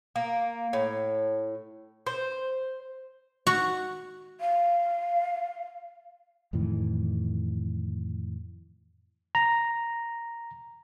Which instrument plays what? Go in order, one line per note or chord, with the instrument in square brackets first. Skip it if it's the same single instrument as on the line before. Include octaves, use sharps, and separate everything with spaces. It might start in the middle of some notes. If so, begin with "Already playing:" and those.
[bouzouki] A#3
A2
C5
[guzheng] F#4
[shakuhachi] F5
[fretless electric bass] F2 A2 D#3 E3
[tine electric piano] A#5